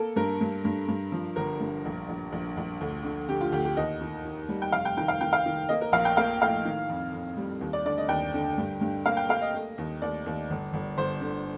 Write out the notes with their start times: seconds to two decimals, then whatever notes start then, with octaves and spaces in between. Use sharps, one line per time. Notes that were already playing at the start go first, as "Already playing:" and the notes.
Already playing: A#3 A4
0.16 G2 A#4
0.41 G2
0.65 G2
0.88 G2
1.12 F3
1.36 G1 A#4
1.61 G2
1.85 A#1
2.09 A#1
2.32 A#1
2.57 A#1
2.81 D2
3.04 D3
3.29 D3 G4
3.41 F4
3.52 D2 G4
3.65 G4
3.77 D#2 D#5
4.01 D#3
4.25 D#3
4.49 G3
4.62 G5
4.72 F1 F5
4.85 G5
4.97 D#3 G5
5.08 F5
5.21 D#3 G5
5.33 F5
5.46 D#3
5.69 A#3 D#5
5.81 A#4
5.92 A#1 F5
6.05 G5
6.17 A#3 F5
6.40 A2 F5
6.65 D#3
6.89 F2
7.13 F2
7.37 G3
7.61 D#2
7.73 D5
7.85 D3 D5
7.98 D#5
8.09 D#2 G5
8.34 D3
8.58 G2
8.81 G2
9.06 A#3 F5
9.17 G5
9.29 A#3 F5
9.42 D#5
9.54 A3
9.78 D#2
10.02 D#2 D5
10.26 D#2
10.50 G1
10.73 G1
10.97 G1 C5
11.21 D3